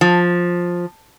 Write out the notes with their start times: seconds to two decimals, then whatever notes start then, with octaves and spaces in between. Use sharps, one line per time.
0.01 F3